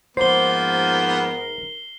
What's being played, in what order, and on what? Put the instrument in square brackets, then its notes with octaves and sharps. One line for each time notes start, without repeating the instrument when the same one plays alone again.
[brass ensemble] G#2 A#4 [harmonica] F3 A#3 B3 [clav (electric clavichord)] C5 [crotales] C7 G7